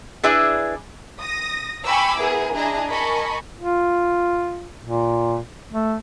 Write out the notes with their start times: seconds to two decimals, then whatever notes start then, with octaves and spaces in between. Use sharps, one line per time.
0.23 D4 E4 G#4 B4 D5 E5
1.19 D#6 A#6
1.84 G5 G#5 B5 C#6 D6 E6
2.19 B3 E4 G#4 A#4
2.55 D4 E4 G#4 D#5 A#5
2.89 A#4 D#5 G#5 A5 B5 C#6
3.57 F4
4.83 A#2
5.72 A3